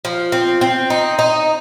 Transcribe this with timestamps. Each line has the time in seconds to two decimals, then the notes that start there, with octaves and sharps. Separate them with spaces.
0.05 F3
0.32 C4
0.61 C4
0.90 D#4
1.19 D#4